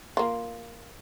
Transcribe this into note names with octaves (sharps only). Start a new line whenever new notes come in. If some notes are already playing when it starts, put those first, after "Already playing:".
A#3 F4